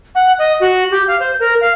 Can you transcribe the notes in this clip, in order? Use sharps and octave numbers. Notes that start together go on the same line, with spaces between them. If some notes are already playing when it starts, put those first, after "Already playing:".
F#5
D#5
F#4
G4
F5
C5
A#4
F5